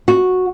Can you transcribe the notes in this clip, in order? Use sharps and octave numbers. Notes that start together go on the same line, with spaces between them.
F#4